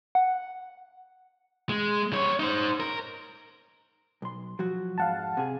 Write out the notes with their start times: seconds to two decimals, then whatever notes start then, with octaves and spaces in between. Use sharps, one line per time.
0.15 F#5
1.69 G#3
2.13 G3 C#5
2.39 D#4 C5
2.80 A#4
4.22 B1 C6
4.59 F3 F#3 F#4
4.98 F2 G#2 F5 F#5 A5
5.37 C3 G#4